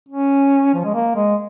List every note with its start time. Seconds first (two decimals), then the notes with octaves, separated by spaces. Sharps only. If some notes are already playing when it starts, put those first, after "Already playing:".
0.09 C#4
0.74 F3
0.84 G#3
0.94 A#3
1.16 G#3